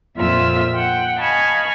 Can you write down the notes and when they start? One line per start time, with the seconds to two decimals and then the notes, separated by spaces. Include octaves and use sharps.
0.16 F2 A#2 A#3 F4 E5 E6
0.76 F#5 G5
1.18 D#5 F5 G#5 A5 B5 C#6